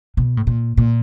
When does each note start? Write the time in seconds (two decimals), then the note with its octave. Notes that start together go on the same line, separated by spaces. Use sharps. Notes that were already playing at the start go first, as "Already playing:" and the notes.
0.17 B2
0.37 A2
0.47 A#2
0.77 A#2